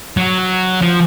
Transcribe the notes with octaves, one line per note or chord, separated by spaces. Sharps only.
F#3
F3